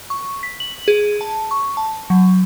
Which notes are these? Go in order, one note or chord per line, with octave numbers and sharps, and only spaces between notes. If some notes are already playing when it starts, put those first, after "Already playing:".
C#6
B6
F#7
G#4
A5
C#6
A5
F#3